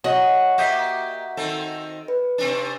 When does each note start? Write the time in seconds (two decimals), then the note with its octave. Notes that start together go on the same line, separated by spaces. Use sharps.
0.04 F#4 C#5 D#5
0.58 A#3 G4 D#5 E5 G6 B6
1.37 D#3 C4 A4
2.08 B4
2.38 C3 C4 D4